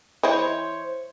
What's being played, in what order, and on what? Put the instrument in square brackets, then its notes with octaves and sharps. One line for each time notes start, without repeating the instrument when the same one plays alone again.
[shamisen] E3 E4 D#5 [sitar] C5 C#5